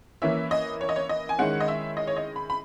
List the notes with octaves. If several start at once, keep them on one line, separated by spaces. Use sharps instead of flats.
E3 A#3 C#4 E4 E5
D#5
C#5
D#5
C#5
D#5
G#5
D#3 G#3 C#4 E4 F#5
D#5
E5
D#5
C#5
D#5
B5
B5